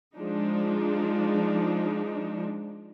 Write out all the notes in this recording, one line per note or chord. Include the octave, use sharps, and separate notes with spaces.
F3 G#3 D4 D#4